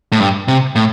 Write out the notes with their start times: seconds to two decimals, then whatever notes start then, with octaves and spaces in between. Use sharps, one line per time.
0.12 A2
0.20 G2
0.48 C3
0.75 A2